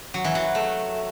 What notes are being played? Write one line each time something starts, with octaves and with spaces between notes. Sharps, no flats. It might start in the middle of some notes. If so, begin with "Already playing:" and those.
F#3
E3
F#3
A3